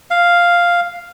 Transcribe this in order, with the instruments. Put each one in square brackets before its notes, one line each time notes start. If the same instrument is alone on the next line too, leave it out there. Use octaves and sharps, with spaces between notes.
[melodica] F5